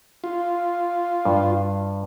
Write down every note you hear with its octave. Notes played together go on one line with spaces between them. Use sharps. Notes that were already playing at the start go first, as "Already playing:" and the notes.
F4
G2